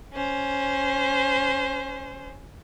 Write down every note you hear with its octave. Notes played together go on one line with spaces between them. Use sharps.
C#4 C5